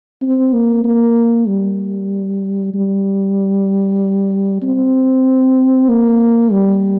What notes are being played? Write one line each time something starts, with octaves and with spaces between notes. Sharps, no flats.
C4
A#3
A#3
G3
G3
C4
A#3
G3